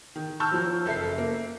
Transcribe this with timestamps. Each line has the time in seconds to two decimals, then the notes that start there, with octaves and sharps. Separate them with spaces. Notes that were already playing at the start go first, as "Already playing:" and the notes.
0.16 D#3
0.40 A5 C#6 E6 F6 G6
0.51 F3 F#3
0.85 F#1 A4 E5 C7
1.18 A#3